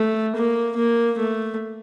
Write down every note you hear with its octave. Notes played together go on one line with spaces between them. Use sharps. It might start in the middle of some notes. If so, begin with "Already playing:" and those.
Already playing: A3
A#3
A#3
A3